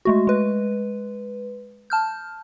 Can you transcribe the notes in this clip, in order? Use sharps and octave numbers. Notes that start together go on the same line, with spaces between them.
G#3 A3 F#4
G#3 B4
A5 F6 G6